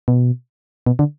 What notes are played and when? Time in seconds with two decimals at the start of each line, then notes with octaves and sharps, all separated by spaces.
0.08 B2
0.86 B2
0.99 D3